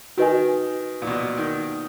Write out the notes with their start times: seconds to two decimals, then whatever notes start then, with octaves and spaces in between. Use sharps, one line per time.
0.17 D#3 F#4 B4 D#5 G#5
1.02 A#2
1.07 B2
1.37 D#3